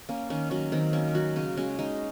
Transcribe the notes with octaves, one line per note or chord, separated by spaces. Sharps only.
A#3 C#4
D#3 C#4
F#3 C#4
D#3 C4
A#3 C#4
F#3 F#4
C#3 C#4
G#3 C#4
G#3 D#4